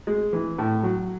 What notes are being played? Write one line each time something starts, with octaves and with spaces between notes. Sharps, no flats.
G#3
E3
A2
F#3